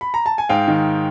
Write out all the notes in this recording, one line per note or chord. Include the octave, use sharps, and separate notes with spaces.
B5
A#5
A5
G#5
G#2 F5 G5
D#3